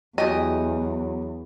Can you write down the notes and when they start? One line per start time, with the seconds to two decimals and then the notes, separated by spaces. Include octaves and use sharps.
0.18 E2 F#3 F#4 G4 D#5 G#5